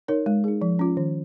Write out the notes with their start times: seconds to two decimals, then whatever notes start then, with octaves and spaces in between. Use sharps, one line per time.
0.08 D#4 A#4 C#5
0.26 G#3
0.44 D#4 G#4
0.62 F3
0.79 C#4 F4
0.97 D#3